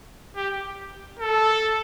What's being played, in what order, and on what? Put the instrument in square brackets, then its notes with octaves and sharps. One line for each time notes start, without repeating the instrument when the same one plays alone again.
[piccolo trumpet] G4
A4